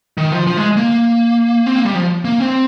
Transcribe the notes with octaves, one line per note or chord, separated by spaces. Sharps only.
D#3
F3
F3
G#3
A#3
C4
A#3
G3
F3
A#3
C4